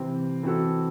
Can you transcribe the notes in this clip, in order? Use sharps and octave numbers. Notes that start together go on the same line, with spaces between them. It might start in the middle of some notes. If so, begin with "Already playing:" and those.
Already playing: C3 E3 C4
E3 C4 F#4 A4